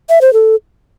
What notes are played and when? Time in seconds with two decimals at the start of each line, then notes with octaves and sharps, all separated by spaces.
0.09 E5
0.21 C5
0.33 A4